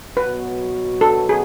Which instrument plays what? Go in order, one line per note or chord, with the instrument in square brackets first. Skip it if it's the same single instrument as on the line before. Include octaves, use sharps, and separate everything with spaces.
[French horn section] B2 F#3 B3 F#4 [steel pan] B4
[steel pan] A4
G#4